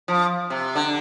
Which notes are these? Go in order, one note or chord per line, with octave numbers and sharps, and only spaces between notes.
F3
C3
D3